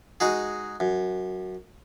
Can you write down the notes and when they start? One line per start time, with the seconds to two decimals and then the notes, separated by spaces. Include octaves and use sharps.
0.20 G#3 D#4 F#4 G#4
0.80 F#2